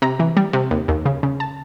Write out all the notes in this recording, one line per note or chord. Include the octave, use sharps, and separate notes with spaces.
C3 A#5
E3
G3
C3
D#2
D#2
C#3
C#3
A5